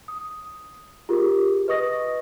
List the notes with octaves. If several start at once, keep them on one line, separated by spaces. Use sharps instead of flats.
D#6
F4 G4 G#4 A#4
B4 D#5 C#6 D#6 A#6